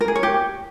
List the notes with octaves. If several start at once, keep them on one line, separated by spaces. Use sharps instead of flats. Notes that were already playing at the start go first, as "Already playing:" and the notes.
A#4
G#4
C#5
G4